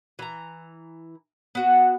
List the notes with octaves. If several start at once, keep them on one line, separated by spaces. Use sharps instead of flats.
E3 A#5
B3 F#4